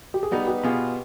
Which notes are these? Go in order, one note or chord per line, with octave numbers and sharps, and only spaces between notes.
G4
G#4
G3 B3 D#4 G4 B4
G4 B4
B2 B3 F4 G#4